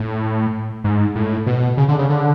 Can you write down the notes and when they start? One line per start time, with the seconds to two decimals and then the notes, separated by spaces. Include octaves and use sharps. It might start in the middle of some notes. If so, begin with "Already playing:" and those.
Already playing: A2
0.84 G#2
1.15 A2
1.46 B2
1.77 C#3
1.88 D3
1.99 C#3
2.09 D3